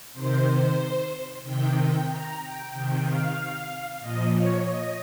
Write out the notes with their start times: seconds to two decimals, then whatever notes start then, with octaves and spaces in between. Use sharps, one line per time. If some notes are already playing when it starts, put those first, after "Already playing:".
0.13 C3 D#3 C5
1.43 C3 D#3 G5
1.75 G5
2.07 A#5
2.39 G5
2.72 C3 D#3 G5
3.04 F5
4.00 A#2 F3 D#5
4.33 C#5
4.65 D#5